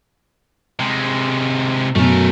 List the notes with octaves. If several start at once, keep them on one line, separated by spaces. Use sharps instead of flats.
C3 G#3
F#2 B2 A3 A#4